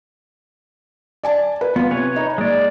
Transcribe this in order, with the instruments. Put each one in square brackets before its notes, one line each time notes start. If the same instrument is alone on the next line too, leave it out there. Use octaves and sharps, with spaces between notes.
[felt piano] D5 G#5 A5
B4
[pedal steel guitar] B3 [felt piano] F4
[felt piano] C3 [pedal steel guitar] B4 C#5 G#5
[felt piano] D#4
[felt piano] A#2 [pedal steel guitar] G#3 D5